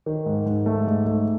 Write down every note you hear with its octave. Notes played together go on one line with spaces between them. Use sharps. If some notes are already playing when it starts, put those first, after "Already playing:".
D#3
G#2
G#2
A3
G#2
A3